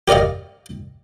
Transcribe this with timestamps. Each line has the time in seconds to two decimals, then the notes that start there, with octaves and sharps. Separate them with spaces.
0.08 G4 A#4 D5 D#5 F5